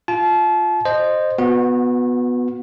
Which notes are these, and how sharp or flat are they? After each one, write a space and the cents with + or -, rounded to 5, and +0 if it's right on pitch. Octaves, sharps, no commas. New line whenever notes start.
F4 +0 A5 -35
C5 +0 D#5 -15
B3 +0 F#4 -30